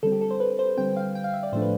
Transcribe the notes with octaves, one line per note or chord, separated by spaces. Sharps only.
D3 G3 C4 A4
G4
A4
C5
B4
C5
D3 G3 C4 G5
F5
G5
F5
E5
D5
A2 F3 A3 D4 C5
B4